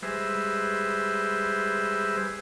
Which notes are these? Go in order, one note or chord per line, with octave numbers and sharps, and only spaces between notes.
G3 G#3 B4 C5 E5